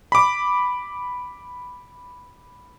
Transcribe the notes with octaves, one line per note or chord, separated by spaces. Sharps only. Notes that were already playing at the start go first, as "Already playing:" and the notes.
B5 D6